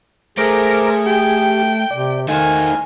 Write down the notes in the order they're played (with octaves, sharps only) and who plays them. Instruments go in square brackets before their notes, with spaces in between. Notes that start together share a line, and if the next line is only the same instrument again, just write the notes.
[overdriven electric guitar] A3 [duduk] G#4 [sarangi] A#4 [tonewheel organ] C5 A#5 D6
[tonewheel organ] G4 [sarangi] G5
[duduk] C3 [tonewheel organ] D5
[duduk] D#3 [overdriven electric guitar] A3 C5 [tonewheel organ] D#4 F5 [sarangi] G#5